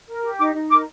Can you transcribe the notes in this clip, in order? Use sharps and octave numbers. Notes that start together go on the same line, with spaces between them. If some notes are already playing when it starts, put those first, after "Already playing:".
A#4
G4
D#4 D6
D#4
A#4 D6